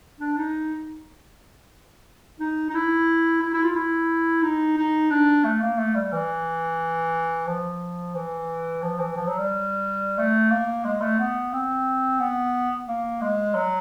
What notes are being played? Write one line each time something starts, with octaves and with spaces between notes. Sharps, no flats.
D4
D#4
D#4
D#4
E4
E4
E4
F4
E4
D#4
D#4
D4
A3
A#3
A3
G3
E3
F3
E3
F3
E3
F3
F#3
G3
A3
A#3
G#3
A3
B3
C4
B3
A#3
G#3
F#3